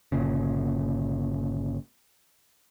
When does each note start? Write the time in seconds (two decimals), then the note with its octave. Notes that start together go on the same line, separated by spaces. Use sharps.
0.12 G1 A#2 C#3